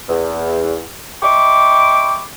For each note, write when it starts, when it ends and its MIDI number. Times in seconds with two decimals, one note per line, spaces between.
0.09 0.83 40
1.23 2.22 75
1.23 2.22 76
1.23 2.22 79
1.23 2.22 83
1.23 2.22 85
1.23 2.22 86